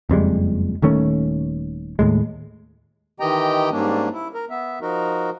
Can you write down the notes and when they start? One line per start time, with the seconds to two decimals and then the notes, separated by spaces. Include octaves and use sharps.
0.09 F#1 F2 G3 G#3
0.82 D#1 D#3 A3 C#4
1.99 D#2 A2 G#3
3.20 D#3 E3 G4 D#5 G5 A#5
3.72 G#2 G3 A#3 C#4 D4
4.13 E4
4.34 A#4
4.50 B3 E5
4.81 F3 D#4 F#4 A#4